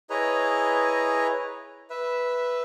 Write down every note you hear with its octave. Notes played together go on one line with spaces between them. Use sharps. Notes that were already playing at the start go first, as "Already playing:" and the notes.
E4 G#4 B4 C#5 D#5 A#5
B4 E5